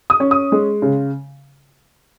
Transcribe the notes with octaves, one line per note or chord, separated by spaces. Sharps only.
D#6
C#4
D#6
G#3
C#3